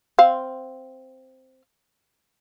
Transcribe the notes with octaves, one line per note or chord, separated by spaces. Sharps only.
C4 F5